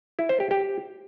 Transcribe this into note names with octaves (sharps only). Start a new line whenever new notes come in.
E4
C5
G4
G4